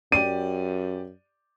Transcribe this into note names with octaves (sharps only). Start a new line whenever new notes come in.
F#2 G4 D5 D#7